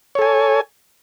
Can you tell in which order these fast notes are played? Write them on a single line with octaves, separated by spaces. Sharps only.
C#5 A4 G#5